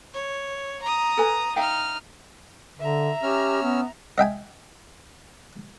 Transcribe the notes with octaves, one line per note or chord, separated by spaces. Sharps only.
C#5
A#5 D#6
A4 B4 G#5
D#4 E5 F5 G5 F6
D3 E5 A#5
C#4 G4 E6 F6
B3
D#5 E5 G5 G#5